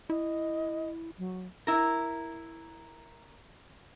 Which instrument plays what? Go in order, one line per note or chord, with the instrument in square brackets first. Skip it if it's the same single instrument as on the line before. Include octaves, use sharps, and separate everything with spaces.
[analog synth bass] E4 [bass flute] D#5
[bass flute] F#3
[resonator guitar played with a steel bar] E4 A#4